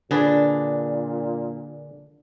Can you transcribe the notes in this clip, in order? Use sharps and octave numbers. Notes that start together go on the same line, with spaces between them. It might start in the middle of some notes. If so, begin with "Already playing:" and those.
A#2 D3 D4 G#4 B4